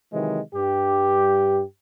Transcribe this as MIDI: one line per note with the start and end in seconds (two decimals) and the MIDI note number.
0.13 0.39 48
0.13 0.39 51
0.13 0.39 52
0.13 0.39 54
0.13 0.39 56
0.54 1.62 43
0.54 1.62 67